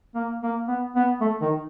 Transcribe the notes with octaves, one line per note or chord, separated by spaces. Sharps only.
A#3
A#3
B3
B3
A3
D#3